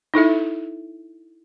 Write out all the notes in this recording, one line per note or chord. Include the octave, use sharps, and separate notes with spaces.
D#4 E4 A4 E5